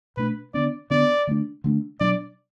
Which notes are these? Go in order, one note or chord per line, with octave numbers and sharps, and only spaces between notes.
B2 A3 D4 B4
D3 B3 D4 D5
D3 B3 D4 D5
D3 A3 D4
D3 A3 D4
B2 F#3 D4 D5